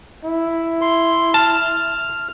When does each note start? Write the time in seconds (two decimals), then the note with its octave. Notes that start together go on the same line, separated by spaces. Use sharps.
0.24 E4
0.81 C6
1.34 A5 F6